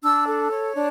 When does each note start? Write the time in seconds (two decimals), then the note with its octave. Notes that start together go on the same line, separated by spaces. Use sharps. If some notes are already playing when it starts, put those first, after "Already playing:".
0.02 D4 E6
0.27 A4
0.51 C#5
0.75 D4